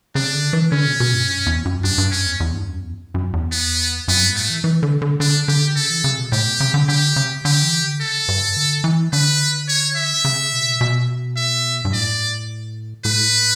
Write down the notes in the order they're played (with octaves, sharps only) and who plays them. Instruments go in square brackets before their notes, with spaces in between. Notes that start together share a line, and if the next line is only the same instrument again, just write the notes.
[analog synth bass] C#3 [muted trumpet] D4
[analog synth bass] D3
E3
[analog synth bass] D3 [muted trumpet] C#4
[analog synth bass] B2
B2
G2
F#2
E2
F#2
[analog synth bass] G2 [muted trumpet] D4
[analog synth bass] G2
[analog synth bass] F#2 [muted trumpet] C#4
[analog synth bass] E2
E2
G2
F#2
E2
F#2
E2
[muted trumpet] B3
[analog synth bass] F#2 [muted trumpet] B3
[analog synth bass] G2
[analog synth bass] A2 [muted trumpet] A3
[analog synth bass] E3
E3
D3
D3
[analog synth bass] D3 [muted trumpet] D4
[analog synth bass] D3 [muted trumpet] G4
[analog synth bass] C#3 [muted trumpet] A4
[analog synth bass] E3
C#3
B2
[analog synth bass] A2 [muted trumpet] G4
[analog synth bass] B2
C#3
D3
[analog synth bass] D3 [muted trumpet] G4
[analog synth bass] C#3
[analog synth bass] D3 [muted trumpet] G4
[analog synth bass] E3
D3
[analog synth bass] C#3 [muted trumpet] A4
[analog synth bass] G2
D3
E3
[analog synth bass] D3 [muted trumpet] B4
[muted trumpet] C#5
E5
[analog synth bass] C#3
B2
B2
[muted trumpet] E5
[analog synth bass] G2
[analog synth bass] A2 [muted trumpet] D5
[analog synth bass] A2 [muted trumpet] B4